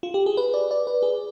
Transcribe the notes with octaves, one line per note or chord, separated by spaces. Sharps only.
F4
G4
G#4
B4
D5
D5
B4
G#4